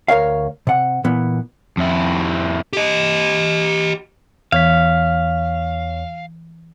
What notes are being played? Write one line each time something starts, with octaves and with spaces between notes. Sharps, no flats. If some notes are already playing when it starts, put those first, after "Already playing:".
D2 A#4 C#5 F5
C3 F#5
A#2 E3 B3
F2 E4
G4 D#5
E2 E3 C#5 F5 B6